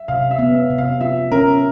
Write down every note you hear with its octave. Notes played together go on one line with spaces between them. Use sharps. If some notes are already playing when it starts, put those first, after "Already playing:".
Already playing: E5
C3 F5
E5
B3
E5
C3
F5
F4 E5
C#4 A#4